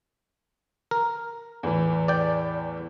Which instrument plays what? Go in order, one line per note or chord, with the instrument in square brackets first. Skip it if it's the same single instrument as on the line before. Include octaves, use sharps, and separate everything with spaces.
[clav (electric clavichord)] A#4
[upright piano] E2 A2 E3
[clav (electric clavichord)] D5 G5